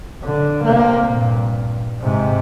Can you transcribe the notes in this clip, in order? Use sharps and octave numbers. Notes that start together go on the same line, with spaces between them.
D3
C3 A#3
G2 A#2
G#2 C3